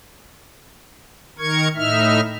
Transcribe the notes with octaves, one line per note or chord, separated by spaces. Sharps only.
D#3 A#4 C#6 G#6
A2 D#4 E5 F6